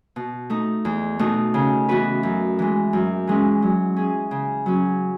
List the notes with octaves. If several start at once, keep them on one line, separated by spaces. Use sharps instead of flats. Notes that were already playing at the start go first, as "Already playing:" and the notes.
B2
A3 D#4
E2
B2 A3 D#4
C#3
E3 B3 F#4 B4
F#2
E3 G#3
F#2
E3 G#3 C#4 E4
F#3
C#4 G#4
C#3
F#3 C#4